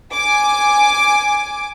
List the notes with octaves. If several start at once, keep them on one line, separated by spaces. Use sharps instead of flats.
G#5 D6